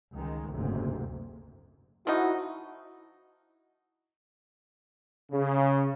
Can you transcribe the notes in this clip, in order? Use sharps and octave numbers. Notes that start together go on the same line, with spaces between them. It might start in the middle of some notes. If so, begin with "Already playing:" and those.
C#2 D#3 G#3
F#1 D2 G#2 C3
F3 D#4 E4 F#4
C#3